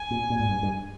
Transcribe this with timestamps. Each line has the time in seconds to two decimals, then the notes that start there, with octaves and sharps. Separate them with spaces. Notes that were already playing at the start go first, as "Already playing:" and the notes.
Already playing: G#5
0.11 A#2
0.30 A#2
0.40 G#2
0.49 G2
0.63 G2